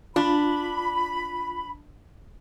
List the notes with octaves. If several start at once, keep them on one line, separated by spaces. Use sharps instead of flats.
D4 F4 B5